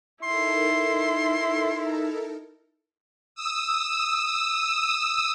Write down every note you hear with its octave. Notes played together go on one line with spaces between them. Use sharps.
D#4 E4 A4 A#4 C6
D#6 E6